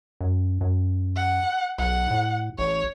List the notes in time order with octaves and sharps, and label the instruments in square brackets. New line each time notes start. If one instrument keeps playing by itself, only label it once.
[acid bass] F#2
F#2
[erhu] F#5
[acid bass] B1 [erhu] F#5
[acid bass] A2
[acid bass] A1 [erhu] C#5